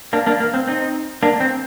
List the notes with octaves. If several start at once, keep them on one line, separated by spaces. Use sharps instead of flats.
A#3 D4
A#3 D4
A#3
C4
C4 D#4
A#3 D4
C4